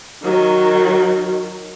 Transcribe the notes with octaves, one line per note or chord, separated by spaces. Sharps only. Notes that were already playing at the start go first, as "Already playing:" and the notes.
D#3 F#3